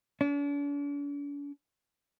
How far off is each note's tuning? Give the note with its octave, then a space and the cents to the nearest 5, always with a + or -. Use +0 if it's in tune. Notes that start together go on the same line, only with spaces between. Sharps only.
D4 -45